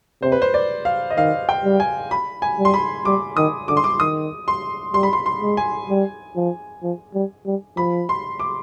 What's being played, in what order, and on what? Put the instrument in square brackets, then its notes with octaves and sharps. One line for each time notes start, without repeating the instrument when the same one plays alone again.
[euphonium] C3 [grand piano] C5
[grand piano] B4
C5
D5
F5
D#5
[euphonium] D#3 [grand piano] F5
[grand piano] G5
[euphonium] G3
[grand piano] G#5
B5
G#5
[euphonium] G3
[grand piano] C6
B5
[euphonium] G3 [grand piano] D6
[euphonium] D#3 [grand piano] D#6
[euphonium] D3 [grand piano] D6
[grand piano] C6
D6
[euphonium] D#3 [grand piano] D#6
[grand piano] C6
[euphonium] G3 [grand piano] C6
[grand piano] B5
C6
C6
[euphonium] G#3
[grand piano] G#5
[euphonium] G3
F3
F3
G3
G3
[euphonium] F3 [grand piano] B5
[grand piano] C6
D6